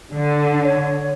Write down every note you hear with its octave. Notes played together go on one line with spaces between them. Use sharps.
D3
C#5